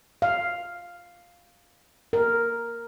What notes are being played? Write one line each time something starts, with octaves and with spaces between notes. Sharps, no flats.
F5
A#4